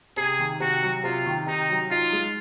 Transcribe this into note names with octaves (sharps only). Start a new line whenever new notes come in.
C3 G#4
D#3
C3 F#4
F#3
C3 F4
D#3
C3 D#4
F#3
D#4 F4
G#3